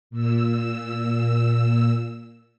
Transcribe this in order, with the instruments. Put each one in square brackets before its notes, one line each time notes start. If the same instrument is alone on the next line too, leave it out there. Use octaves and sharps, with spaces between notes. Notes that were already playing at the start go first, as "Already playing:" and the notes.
[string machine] A#2 E6